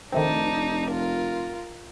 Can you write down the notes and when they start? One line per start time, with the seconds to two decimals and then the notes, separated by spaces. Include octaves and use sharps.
0.12 F1 D#3 A3 C4 D4 D#4
0.91 F4 A#4